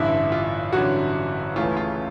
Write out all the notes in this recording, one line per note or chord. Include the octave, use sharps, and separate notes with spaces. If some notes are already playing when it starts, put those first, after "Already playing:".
Already playing: A1 G2 D3 E4
F4
A1 G2 D3 F#3 F#4
C#2 C#3 E3 A3 C#4 F4
F4